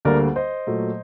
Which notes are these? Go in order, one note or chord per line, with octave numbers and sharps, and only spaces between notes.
D2 D3 G3 A#3 A#4 D5
C5 D#5
A#2 F#3 A3